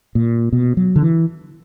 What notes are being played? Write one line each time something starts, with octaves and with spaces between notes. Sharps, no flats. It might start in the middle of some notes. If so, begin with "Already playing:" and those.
A#2
B2
F#3
D3
E3